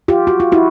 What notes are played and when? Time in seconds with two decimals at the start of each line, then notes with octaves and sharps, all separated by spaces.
0.08 F4 G4
0.27 F#4
0.40 F4
0.52 E4 F#4